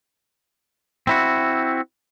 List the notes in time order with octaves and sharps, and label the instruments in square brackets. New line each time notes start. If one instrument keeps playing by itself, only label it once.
[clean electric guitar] C4 E4 F#4